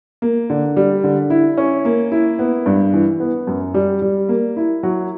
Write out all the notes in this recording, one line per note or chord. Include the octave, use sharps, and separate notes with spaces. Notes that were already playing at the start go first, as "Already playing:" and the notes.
A#3
D3
G3
D3
E4
C#4
A#3
E4
B3
G2
E3
B3
F#2
G3
G3
A#3
E4
F#3